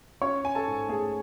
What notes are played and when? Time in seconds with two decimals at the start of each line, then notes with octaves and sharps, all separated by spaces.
0.22 C#4 C#5 C#6
0.44 C#4 G#5
0.55 A4 A5
0.67 G#2
0.89 A3 G#4 G#5